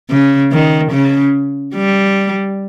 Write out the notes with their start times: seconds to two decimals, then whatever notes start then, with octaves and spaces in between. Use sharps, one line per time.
0.10 C#3
0.52 D#3
0.92 C#3
1.75 G3